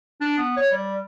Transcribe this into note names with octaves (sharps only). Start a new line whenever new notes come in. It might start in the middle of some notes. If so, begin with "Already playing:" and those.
D4
B3
C#5
G3